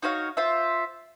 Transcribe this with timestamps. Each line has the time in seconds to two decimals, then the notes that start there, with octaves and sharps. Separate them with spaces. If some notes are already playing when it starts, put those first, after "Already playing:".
0.02 D#4 F#4 C#5 F5
0.37 F4 C5 E5